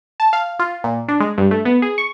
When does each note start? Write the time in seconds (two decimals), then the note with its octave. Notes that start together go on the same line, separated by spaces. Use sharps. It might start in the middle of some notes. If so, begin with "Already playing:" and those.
0.20 A5
0.33 F5
0.59 F4
0.84 A#2
1.08 D4
1.20 G#3
1.38 G2
1.51 A3
1.65 B3
1.82 G#4
1.98 C#6